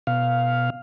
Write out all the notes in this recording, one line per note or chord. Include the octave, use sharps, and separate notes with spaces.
B2 F5